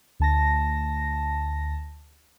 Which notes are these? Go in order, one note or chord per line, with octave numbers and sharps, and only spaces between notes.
D2 A5 A#6